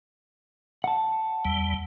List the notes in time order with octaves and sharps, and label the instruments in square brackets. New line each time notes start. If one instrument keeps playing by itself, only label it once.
[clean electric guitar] F#5 A5
[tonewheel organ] E2 G3